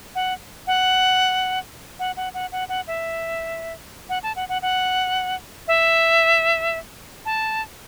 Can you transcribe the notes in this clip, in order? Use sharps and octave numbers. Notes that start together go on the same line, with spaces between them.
F#5
F#5
F#5
F#5
F#5
F#5
F#5
E5
F#5
A5
F#5
F#5
F#5
E5
A5